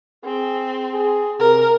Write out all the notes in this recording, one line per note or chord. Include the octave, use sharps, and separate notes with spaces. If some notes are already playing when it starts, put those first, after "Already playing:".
C4 G#4
G#4
C3 A#4